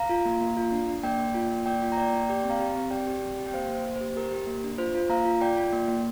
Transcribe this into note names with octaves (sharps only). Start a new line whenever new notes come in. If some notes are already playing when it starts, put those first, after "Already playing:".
Already playing: F5 A#5
F4
A#3
A#3
F4
D4
D4
A#3 D5 G5
A#3
F4
A#3
A#3 D5 G5
F4
A#5
A#3 D5 G5
A#3
G4 D5 G5
C4
F5 A#5
G4
C4
G4 D5 G5
G4
C4
G4
G5
A#3 C5 F5
A#3
C5
A#3
G4 C5
G4 A#4
G4
A#3
D4
F4 C5
F4
A#3 F5 A#5
F4
F4 D5 G5
F4
A#3
A#3